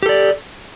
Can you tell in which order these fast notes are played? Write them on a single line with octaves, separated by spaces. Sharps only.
G4 A4 D5